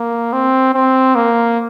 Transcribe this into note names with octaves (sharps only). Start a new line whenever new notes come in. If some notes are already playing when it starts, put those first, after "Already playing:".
Already playing: A#3
C4
C4
A#3